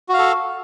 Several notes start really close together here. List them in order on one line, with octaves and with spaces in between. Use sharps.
F#4 F5 A4